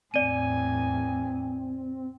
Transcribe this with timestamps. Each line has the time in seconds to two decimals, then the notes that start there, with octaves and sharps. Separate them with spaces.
0.14 E2 A2 C4 D5 G#5 D#7